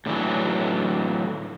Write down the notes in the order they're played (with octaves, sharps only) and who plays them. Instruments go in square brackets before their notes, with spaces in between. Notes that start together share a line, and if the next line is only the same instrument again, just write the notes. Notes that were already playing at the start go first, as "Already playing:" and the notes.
[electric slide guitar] A2 D3 E3 F#3